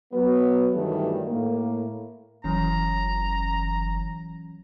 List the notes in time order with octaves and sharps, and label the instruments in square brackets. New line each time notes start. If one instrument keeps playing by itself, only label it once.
[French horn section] F#3 B3
G2 D#3 E3 F#3 G3 A3
A2 A#3
[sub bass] F#1 [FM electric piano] E3 F#3 C#4 [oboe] A#5